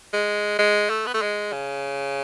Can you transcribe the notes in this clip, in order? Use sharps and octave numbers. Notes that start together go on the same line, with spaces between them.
G#3
G#3
A3
B3
A3
G#3
C#3